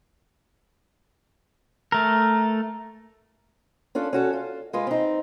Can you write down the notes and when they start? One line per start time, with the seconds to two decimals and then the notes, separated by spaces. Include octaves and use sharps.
1.92 A3 A#4
3.95 C#4 D4 F4 A4
4.13 C#4 F#4 A4
4.33 F4
4.73 G#3 F4 B4
4.87 C4 D#4